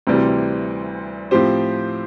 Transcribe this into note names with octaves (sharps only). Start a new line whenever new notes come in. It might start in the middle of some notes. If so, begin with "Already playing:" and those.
D2 C3 E3 G3 C4
A2 F3 C4 G4 C5